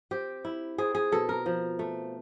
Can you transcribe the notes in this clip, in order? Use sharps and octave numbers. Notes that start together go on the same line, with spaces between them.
C4 G4
E4
C4 G#4
G#4
B2 A4
A#4
F3
A3